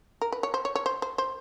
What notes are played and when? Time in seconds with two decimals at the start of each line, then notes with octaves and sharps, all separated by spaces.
0.22 A#4
0.32 B4
0.43 C#5
0.54 C5
0.65 C#5
0.75 C#5
0.86 C5
1.02 C5
1.18 C5